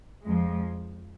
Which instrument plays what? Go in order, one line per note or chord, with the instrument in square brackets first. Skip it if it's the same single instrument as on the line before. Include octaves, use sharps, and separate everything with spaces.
[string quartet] F2 F3 G#3